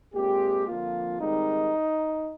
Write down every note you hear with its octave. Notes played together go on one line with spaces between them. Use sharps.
A#2 G#3 C4 G4
F2 D3 F3 A#3 F4
G#2 D#3 G3 C4 D#4